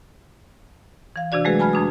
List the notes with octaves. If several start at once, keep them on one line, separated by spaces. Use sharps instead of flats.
E3 F5
C3 E3 D4 F#4 D5
F#3 G#3 A3 F#4 G#4 B4
G#5 A5 B5 F6 G#6
F2 D4 D#6